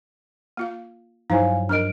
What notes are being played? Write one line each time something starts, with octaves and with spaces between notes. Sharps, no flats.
A#3 F4 F5
G2 F3 F#3 D#4 E4 C5 F5 G#5
D4 A#4 D#5 F6 D7